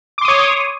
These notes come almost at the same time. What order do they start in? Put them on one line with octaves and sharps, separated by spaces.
D6 C6 D#6 C#5